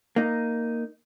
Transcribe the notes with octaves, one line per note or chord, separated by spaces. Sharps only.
A#3 D#4